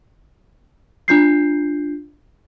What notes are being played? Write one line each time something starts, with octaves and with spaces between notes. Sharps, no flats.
D4 F4 G6 C7